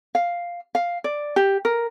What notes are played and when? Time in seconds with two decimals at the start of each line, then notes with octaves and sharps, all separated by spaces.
0.15 F5
0.75 F5
1.04 D5
1.36 G4
1.65 A#4